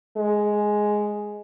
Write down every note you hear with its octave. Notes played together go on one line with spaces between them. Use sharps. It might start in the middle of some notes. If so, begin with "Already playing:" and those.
G#3